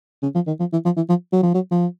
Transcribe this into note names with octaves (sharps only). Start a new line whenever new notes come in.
C#3
F3
D#3
F3
E3
F3
E3
F3
F#3
F3
F#3
F3